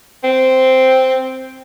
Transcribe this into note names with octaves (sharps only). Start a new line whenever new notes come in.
C4